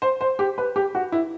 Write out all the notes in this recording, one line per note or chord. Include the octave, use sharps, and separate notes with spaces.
C5
C5
G4
B4
G4
F#4
E4